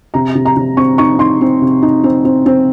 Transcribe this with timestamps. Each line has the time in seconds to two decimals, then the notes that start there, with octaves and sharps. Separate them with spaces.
0.14 C3 A#5
0.35 C3
0.45 A#5
0.56 C3
0.77 C4 C#6
0.98 D#4 C#6
1.19 D#4 C6
1.41 C4
1.62 C3
1.82 D#4
2.04 C4
2.25 C4
2.46 C4